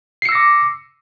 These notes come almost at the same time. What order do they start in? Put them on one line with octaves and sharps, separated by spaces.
C7 C#7 E6 A#6 D6